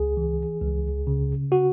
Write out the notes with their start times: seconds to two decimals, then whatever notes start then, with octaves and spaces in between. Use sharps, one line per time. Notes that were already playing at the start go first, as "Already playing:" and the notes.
Already playing: C#2 G#4
0.17 E3
0.62 C#2
1.07 C#3
1.52 F#4